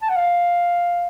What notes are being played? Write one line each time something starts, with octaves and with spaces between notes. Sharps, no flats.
A5
F#5
F5